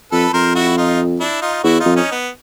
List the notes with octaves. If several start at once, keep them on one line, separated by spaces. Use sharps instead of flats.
F2 A4 B4
F2 A#4 C5
E4 F#4
D#4 F4
D4 E4
D#4 F4
E2 E4 F#4
D#4 F4
F2
C#4 D#4
B3